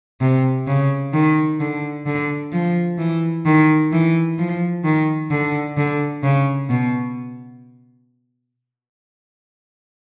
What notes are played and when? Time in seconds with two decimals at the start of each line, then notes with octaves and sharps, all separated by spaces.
0.21 C3
0.67 C#3
1.13 D#3
1.60 D3
2.06 D3
2.53 F3
2.98 E3
3.46 D#3
3.92 E3
4.38 F3
4.84 D#3
5.31 D3
5.77 D3
6.23 C#3
6.70 B2